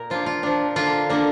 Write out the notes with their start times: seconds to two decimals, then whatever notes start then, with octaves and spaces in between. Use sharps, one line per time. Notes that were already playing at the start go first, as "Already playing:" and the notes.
Already playing: A#2 A#4
0.10 F3 A#3 D4 F4
0.26 F4
0.43 F3 D4
0.76 D3 A#3 D4 F4
1.10 D3 A#3 D4